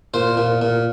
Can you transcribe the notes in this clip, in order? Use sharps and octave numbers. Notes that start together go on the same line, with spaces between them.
A#2 C5
A#2
A#2